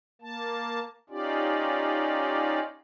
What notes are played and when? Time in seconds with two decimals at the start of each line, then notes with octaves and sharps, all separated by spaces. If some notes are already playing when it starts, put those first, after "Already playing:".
0.22 A#3 A5
1.10 C#4 D#4 F4 G4 D5